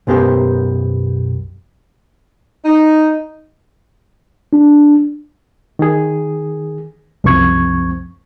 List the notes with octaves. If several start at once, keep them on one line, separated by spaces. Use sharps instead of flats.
B1 F#2 B3 G4 A#4 C5
D#4
D4
D#3 G#4
C2 F#2 F3 C4 C#6 G#6